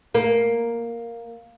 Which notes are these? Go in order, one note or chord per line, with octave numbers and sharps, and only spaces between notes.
A#3